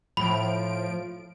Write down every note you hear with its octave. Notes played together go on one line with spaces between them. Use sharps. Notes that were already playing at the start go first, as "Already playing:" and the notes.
A2 F3 B5 D7